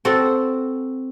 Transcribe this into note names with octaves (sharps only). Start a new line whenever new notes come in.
C4 F#4 A4